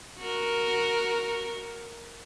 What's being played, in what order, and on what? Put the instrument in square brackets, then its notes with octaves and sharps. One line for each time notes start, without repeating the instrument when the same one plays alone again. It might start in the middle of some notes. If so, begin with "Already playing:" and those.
[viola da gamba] F#4 A#4